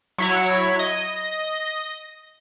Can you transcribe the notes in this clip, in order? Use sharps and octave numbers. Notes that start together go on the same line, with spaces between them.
F#3 E4 C#5
D#5 A#6